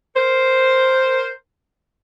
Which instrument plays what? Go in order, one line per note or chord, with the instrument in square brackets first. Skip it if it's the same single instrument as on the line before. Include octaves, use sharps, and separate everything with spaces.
[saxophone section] A#4 C5